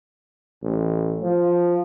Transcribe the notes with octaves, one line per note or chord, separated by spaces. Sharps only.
A1
F3